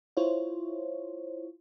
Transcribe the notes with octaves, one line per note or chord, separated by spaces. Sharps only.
E4 F4 C5 C#5